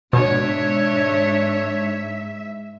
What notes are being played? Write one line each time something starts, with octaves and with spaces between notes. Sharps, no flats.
G#2 B2 D4 C#5 E5